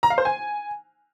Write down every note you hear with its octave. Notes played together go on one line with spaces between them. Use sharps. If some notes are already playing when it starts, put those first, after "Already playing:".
A#5
F5
C5
G#5